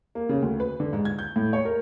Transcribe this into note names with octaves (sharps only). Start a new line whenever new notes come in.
A#3
C#3
D2
B4
D3
G#2
G#6
G6
A2
C#5
A#4